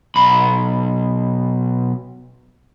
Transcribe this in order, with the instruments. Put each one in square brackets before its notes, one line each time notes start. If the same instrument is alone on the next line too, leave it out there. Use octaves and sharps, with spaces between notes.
[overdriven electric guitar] B1 B5